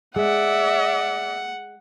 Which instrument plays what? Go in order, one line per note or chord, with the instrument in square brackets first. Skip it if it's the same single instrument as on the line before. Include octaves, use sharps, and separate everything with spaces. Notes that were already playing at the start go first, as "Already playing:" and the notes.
[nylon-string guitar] G#3 [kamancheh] D5 E5 [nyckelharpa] F#5